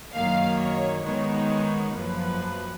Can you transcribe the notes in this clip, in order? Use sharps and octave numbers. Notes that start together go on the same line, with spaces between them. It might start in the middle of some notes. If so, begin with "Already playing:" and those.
F#2 D#3 A#3 F5
C#5
D#3 G#3 B3 D#4 C#5
F#2 F3 A#3 B4